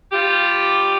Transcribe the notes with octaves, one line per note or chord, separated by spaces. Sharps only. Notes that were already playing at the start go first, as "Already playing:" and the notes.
G3 F4 G4